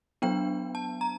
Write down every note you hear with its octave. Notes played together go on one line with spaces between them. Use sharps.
F#3 B3 D4 G5
A5
A#5